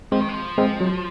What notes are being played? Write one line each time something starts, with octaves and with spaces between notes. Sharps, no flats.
F3 G#3 C4
D#3
F3
G#3 C4
F#3